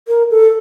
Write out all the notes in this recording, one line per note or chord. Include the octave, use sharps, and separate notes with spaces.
A#4
A4